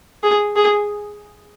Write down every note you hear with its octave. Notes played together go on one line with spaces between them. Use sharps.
G#4
G#4